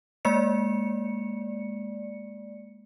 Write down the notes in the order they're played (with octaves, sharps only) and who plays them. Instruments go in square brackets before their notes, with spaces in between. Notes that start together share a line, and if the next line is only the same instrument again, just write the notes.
[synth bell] G#3 A#3 D5 C#7